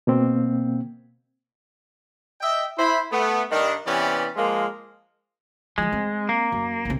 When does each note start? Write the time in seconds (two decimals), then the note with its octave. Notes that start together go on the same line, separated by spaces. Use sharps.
0.07 B2 A#3 C4
2.41 D#5 E5 G5
2.77 E4 C5 B5
3.11 A3 B3
3.50 G2 D#3 D4
3.86 C3 E3 B3 C#4 G4 D5
4.35 F3 G#3 A#3 F4
5.78 D#3 F3 G#3
5.92 C4
6.29 A#3
6.52 F#2
6.85 B1 C3